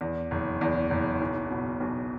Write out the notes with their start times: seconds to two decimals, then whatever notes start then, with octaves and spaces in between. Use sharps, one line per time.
0.01 E2
0.31 F#1
0.61 E2
0.90 F#1
1.21 B1
1.51 B2
1.80 B1